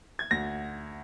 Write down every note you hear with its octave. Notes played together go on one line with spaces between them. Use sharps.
G#6
D2 A#6